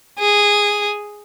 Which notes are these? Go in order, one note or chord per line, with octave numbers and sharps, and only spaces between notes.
G#4